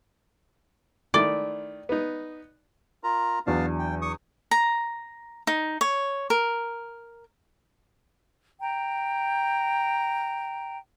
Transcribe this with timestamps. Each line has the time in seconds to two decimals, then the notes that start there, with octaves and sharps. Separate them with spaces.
1.14 D#3 A3 E4 D5
1.89 B3 D#4
3.04 F4 A#4 A#5
3.47 E2 F#3 B3 D4 F5 A5
3.79 G5
4.02 C#6 D#6
4.51 A#5
5.47 D#4
5.81 C#5
6.30 A#4
8.61 G5 A#5